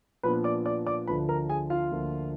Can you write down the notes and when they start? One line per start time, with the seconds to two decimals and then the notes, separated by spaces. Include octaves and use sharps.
0.23 A#2 F3 B3 D4 B4 B5
0.44 D5 D6
0.66 D5 D6
0.86 D5 D6
1.07 D2 D3 F3 B4 B5
1.29 A#4 A#5
1.49 G#4 G#5
1.70 F4 F5
1.91 D2 D3 F3 A#3